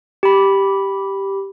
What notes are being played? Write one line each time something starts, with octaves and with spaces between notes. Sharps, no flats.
G4 B5